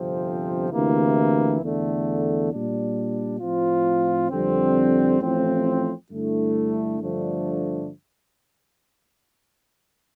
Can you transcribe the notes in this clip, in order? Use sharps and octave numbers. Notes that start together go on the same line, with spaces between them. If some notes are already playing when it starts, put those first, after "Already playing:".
Already playing: G1 F2 C3 F3 C4
D2 C3 E3 A#3 E4
E2 D3 A3
A#2 G3 D4
A2 F3 C4 F4
F2 D3 G3 C4
A1 A2 F3 C4
G2 D3 A3 E4
G2 D3 F3 A3 D4